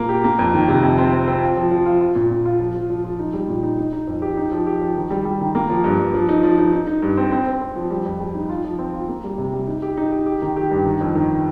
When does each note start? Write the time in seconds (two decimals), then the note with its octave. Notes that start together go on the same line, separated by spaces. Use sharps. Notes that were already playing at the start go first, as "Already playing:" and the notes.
Already playing: A#2 A#3
0.09 G4
0.24 A#3
0.39 F2
0.54 D#3
0.68 C3
0.83 F2
0.98 C4
1.13 C4
1.27 C4
1.42 F4
1.57 F3
1.71 F3
1.86 F4
2.01 F4
2.15 A#2
2.30 A#2
2.45 F4
2.60 F3
2.75 F3
2.90 F3
3.04 F3
3.19 D#4
3.33 G3
3.48 A#2
3.63 D#4
3.78 D#4
3.93 D#4
4.07 F2
4.22 G4
4.37 D#4
4.52 F3
4.66 G4
4.81 F3
4.96 D#3
5.10 G3
5.25 G3
5.40 D#3
5.55 A#3
5.70 F3
5.84 G2
5.99 G2
6.14 F3
6.29 D#4
6.43 F3
6.58 D#4
6.73 D#4
6.87 D#4
7.02 G2
7.17 C4
7.32 C4
7.47 C4
7.61 C4
7.76 F3
7.90 G3
8.06 F2
8.20 G3
8.35 D#4
8.49 F4
8.64 F3
8.79 C4
8.94 F4
9.09 A#3
9.24 G3
9.38 C3
9.53 G3
9.67 D#4
9.82 G4
9.97 D#4
10.12 G4
10.26 G4
10.42 D#3
10.56 G4
10.71 G2
10.86 D#3
11.01 F2
11.15 D#3